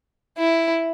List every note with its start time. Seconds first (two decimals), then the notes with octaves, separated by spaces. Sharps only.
0.38 E4